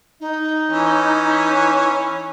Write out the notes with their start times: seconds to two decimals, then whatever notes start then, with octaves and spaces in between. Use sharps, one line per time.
0.20 D#4
0.70 E3 C#4